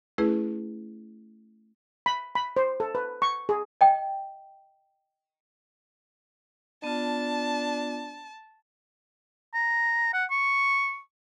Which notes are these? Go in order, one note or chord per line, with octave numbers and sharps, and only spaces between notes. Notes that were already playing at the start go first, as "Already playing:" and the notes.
A3 C#4 E4 G#4 B4
B5
B5
C5
A4
B4
C#6
G#4
D#5 G5
B3 D4 F4 A5
A#5
F#5
C#6